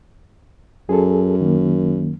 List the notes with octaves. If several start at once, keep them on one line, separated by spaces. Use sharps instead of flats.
F#2 G#4 A4
D#3 A#3